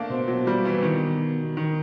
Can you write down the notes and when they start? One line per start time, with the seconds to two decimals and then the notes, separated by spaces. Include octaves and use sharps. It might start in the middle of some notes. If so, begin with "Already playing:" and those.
Already playing: A3 A#3 D4
0.10 B2 C4
0.28 F#3
0.47 G3
0.65 E3
0.83 D#3
1.57 D#3